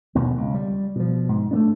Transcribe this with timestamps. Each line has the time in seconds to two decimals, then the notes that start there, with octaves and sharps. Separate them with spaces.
0.15 F1 D#2 B2 A#3
0.38 C#2
0.54 G3
0.96 B2 F3
1.29 G#2
1.51 A3 B3 D4